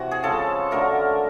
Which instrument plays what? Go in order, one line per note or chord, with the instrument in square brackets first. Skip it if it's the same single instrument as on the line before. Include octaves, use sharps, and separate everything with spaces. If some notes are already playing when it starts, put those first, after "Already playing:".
Already playing: [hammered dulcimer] C3 E3 F#4
G#4
C#3 F3 G#3 A4
D3 F#3 A3 A#4